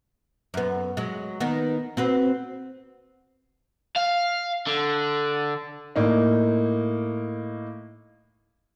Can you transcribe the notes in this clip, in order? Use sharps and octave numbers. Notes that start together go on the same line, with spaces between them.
F#2 B3
F#3 G#3
D#3 B3 D#4
C4 F#4 B4
F5
D3
A2 A#3 D#4